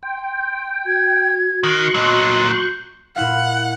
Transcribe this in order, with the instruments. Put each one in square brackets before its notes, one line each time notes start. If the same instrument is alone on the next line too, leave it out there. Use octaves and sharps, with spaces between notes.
[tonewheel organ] G5 [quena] C6
[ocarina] F#4 [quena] G#6
[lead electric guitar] D#3 [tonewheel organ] C6 C#6 F#6
[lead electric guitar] A#2 F#3 [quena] D#5
[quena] G6
[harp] A#2 E4 F5 [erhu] F#5